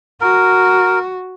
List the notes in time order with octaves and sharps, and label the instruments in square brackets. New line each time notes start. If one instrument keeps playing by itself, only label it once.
[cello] F#4 [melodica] A#4